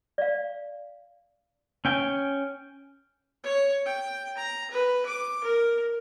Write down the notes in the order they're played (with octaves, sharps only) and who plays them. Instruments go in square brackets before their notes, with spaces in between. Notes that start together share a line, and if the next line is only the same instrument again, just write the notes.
[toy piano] D5 F5
[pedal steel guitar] C#4 G5 G#5
[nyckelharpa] C#5
G5
A#5
B4
D6
A#4